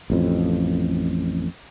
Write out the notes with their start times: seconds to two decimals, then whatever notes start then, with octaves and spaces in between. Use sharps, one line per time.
0.10 A1 F2